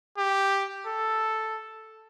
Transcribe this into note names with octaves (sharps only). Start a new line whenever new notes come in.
G4
A4